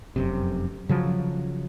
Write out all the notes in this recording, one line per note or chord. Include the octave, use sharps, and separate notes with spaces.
F1 F#2 C3
C#3 F3 F#3